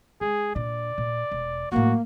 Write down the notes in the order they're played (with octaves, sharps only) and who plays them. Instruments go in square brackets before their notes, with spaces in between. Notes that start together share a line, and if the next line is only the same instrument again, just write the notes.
[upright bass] G#3 [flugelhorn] G#4
[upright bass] A#2 D4 [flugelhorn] D5
[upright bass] A#2
E1
[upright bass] A2 F#3 [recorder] A#3 [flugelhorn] F#4